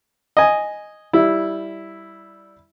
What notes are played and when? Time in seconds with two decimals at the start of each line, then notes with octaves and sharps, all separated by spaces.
0.37 D#5 G#5
1.13 G3 E4